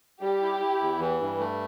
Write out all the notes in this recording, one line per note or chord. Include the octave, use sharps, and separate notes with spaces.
G3 G4
E4
E4
E2
E3
G2
A3